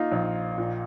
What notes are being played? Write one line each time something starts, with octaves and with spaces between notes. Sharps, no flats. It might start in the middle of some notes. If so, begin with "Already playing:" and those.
Already playing: A#3 D#4 F4
A#1
A#2